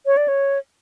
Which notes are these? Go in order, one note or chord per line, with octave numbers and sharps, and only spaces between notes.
C#5
D5
C#5